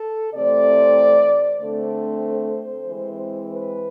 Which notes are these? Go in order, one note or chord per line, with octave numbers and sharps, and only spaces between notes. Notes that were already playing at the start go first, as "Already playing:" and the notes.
Already playing: A4
C3 E3 A3 C4 D5
D3 A3 C4 C5
E3 G#3 C4
B4